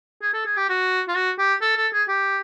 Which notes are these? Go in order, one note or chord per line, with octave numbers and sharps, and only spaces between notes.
G#4
A4
G#4
G4
F#4
F4
F#4
G4
A4
A4
G#4
G4